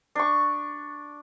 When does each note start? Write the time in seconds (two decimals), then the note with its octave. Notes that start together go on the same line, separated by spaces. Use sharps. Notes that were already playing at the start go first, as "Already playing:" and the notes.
0.15 D4 C#6